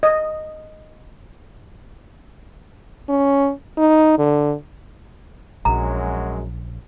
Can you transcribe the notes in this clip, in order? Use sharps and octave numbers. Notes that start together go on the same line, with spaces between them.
D#5
C#4
D#4
D3
A#1 F#2 F#3 G#3 A#5